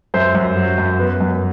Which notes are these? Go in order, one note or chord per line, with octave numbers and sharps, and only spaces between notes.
F#2 C5 E5
F#2
F#3
F#2
B3
F#2